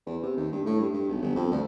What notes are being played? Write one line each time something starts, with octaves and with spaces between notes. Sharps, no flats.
E2
C3
D#2
G2
A2
G2
G2
B1
G1
F2
D2